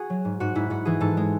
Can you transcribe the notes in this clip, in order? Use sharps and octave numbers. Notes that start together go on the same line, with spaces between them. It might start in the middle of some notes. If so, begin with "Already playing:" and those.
Already playing: F#4 G#4
F#3
G#2
G#2 F#4
G#2 E4
G#2 F#4
E3 G#4
G#2 A4
G#3